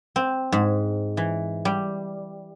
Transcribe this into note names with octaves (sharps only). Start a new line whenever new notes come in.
C4
G#2
E3
G3